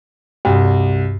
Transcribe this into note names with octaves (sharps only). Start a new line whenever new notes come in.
C2 G2